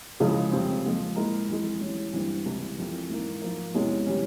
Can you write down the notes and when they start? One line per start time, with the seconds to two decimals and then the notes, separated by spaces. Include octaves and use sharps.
0.20 C#2 C#3 F3 G#3 E4
0.52 F2 C#3 G3 C4
0.85 A#2 F3 G#3
1.16 A#2 G#3 E4 A#4
1.48 F2 E3 G#3
1.81 E3 G3 C#4
2.13 G2 E3 G3 C4
2.46 C#2 C3 E3
2.78 F2 E3 A#3 F4
3.09 G#2 E3 A#3
3.42 G#2 F3 A#3
3.74 E2 C3 E3 G#3 C#4
4.06 C3 E3 G3 C#4